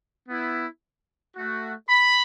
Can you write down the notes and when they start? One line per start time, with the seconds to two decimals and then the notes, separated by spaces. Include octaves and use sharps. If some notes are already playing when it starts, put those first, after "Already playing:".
0.28 B3 E4
1.36 A3 F#4
1.89 B5